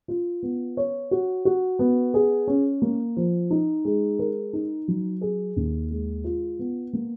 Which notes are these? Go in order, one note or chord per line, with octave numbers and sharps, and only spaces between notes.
F4
B3
C#5
F#4
F#4
B3
G#4
C#4
A#3
F3
D#4
G#3
A#4
D#4
F#3
G#4
D#2
G#3
F4
B3
A#3